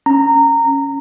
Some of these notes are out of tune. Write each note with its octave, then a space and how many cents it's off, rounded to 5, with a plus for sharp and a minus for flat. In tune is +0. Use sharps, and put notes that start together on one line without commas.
C#4 +0 A#5 -15